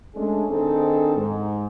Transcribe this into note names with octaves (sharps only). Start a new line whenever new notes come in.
G#3 A3 C#4 D4 G#4 A4
D#3 C4 D4 D#4 G#4 A4
G#2